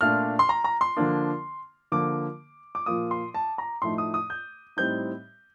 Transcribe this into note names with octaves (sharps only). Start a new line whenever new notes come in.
A#2 A3 D4 F4 F6
C6
A#5
A#5
C6
D3 F3 A#3 D4
D3 F3 A#3 D6
D6
A#2 F3 A#3 F4 D#6
C6
A5
A#5
A2 F3 A3 D#4 C6
D#6
D#6
G6
A2 G3 C4 D#4 G6